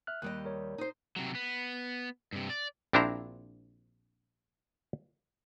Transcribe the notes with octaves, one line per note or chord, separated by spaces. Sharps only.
E5 F6 F#6
D#2 G3 D#5 F#6
A#4 C#5
D#4 C5
C3 F#3
B3
G2 C3
D5
A#1 C4 D4 E4 C5 A#5